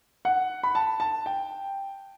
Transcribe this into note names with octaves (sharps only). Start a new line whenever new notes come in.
F#5
B5
A5
A5
G5